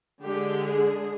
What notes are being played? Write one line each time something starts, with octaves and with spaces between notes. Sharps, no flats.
D3 G#3 D4 G4
G#4